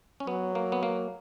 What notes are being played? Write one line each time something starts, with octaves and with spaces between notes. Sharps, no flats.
C#4
F#3 B3
A#3
B3
A#3